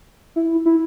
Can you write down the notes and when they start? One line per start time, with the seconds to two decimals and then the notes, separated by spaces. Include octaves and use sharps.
0.36 E4
0.66 E4